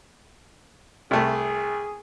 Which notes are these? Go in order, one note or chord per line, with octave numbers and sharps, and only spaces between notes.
C2 A3 G#4